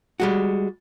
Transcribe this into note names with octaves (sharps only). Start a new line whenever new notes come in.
G3 G#3 F#4